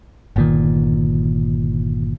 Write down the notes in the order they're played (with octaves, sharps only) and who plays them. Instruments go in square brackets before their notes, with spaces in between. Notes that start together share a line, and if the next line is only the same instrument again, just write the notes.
[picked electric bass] G1 A#2 D#3